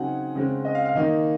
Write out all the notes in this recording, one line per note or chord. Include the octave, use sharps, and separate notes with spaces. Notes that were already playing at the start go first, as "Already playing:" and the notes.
Already playing: C#3 F#3 C4 D#4 F#5 G#5
C#3 G#3 C4
D#5
F5
F5
D#3 A#3 D#4 D#5